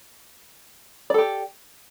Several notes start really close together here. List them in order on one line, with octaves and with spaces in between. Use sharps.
D5 A4 G4